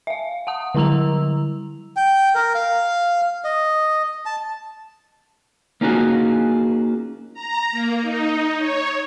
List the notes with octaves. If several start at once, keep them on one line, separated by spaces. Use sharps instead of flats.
E5 F5
F#5 A5 D#6
D3 G3 E4 A#5 E6 F7
G5
A#4
F5
D#5
A5
A#3 C#4 D#4 F4 F#4 G#4
A#5
A#3
D#4
C#5